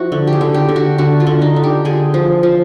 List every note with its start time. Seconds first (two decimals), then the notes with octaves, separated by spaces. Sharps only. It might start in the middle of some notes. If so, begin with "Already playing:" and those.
Already playing: F3 E4 F#4
0.12 D3
0.27 G4
0.33 G#4
0.41 D3
0.54 G4
0.69 D3
0.76 F#4
0.98 D3 F#4
1.20 F4
1.27 D3
1.42 D#4
1.56 D3
1.64 G4
1.85 D3 G#4
2.14 F3
2.43 F3